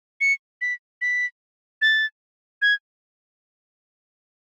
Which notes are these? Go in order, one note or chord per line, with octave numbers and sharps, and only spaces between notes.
C#7
B6
B6
A6
G#6